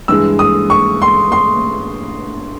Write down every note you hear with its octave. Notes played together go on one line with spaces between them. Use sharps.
G2 E3 G#3 E6
D#6
C#6
C6
C6